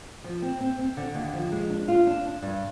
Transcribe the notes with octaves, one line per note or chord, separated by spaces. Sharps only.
F3
C4
C4
C4
D3
D#2
F3
G#3
D4
F4
D4
D4
G2